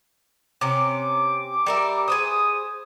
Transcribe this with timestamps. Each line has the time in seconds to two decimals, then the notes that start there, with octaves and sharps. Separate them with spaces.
0.61 C3 C#4 D6
1.66 G3 A#4 E5
2.08 G#4 B4 C5 D#6